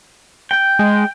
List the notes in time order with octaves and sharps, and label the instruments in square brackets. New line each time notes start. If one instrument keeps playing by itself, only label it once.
[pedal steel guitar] G5
[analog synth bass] G#3